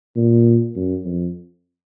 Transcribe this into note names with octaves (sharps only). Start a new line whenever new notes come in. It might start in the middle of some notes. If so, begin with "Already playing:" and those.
A#2
F#2
F2